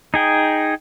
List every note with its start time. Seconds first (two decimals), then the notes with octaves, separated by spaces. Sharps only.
0.14 D#4 G#4 G5